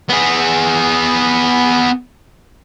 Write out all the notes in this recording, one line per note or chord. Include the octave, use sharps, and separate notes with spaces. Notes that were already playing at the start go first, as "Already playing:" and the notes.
B3 G#4